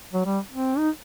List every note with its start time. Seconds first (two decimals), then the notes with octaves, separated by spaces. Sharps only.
0.13 F#3
0.25 G3
0.52 C4
0.78 D#4